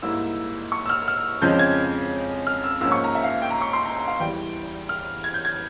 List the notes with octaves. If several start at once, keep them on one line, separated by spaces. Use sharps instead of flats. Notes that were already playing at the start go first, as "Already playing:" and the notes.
G#2 G3 A#3 E4 E6
C#6
E6
F6
F6
F2 C#3 F3 G#3 C#4 G6
G#6
F6
E6
G#2 F3 A#3 C#4 E6
C#6
A#5
E5
F5
G5
A#5
C#6
C6
A#5
A#5
F5
E2 E3 G3 G5
F6
G#6
G6
G#6